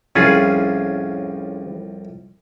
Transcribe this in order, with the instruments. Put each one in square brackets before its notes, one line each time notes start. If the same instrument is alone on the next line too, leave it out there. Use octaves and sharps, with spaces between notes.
[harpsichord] C2 F2 A2 [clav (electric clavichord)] C#4 F4 G#4